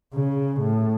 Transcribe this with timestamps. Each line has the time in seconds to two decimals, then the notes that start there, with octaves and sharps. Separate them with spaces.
0.14 C#3
0.61 A2